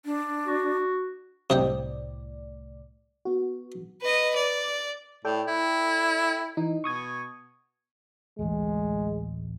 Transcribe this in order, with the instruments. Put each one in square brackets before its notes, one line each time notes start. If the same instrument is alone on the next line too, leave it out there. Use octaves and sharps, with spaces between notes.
[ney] D4
[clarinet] F#4
[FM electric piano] C2 A2 D5 [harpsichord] C3 D#5 G5
[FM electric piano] B3 F#4
[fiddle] B4 D#5
D5
[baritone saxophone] A2 [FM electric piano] A4 D5 G5
[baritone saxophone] E4
[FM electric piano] E3 D#4
[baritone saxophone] B2 [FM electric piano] C#6 D#6 G#6
[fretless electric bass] D1 A1 [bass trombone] G#3